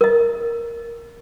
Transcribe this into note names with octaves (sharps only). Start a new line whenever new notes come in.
A#4 D#5